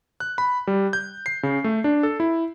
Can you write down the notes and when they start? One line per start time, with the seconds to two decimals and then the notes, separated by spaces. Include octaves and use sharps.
0.20 F#6
0.38 B5
0.67 G3
0.93 G6
1.26 C7
1.43 C#3
1.64 A3
1.84 D4
2.03 A4
2.20 E4